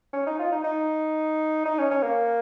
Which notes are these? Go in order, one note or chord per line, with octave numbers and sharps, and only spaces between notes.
C#4
D#4
F4
D#4
D#4
D#4
C#4
C#4
A#3